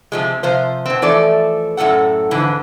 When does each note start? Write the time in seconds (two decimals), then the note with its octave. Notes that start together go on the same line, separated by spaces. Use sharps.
0.12 C3 F3 G#3
0.43 C3 F3 C5
0.86 B2 C4
1.02 E3 F3 A3 D5
1.77 F#2 A2 F3 A4 F#5
2.31 F2 G#2 D3 E3